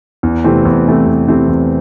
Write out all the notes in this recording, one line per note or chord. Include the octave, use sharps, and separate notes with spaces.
E2
C3 E3 A3 C4
E2
C3 E3 A3 C4
E2
C3 E3 A3 C4
E2